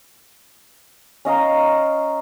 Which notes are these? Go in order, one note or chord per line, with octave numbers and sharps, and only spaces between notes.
C#4 D#5 F5 A#5